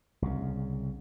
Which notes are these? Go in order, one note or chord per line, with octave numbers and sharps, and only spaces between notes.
C2 C#3